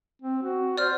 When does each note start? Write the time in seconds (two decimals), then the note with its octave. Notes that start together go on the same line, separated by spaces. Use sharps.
0.22 C4
0.42 F#4
0.78 C5 D5 F6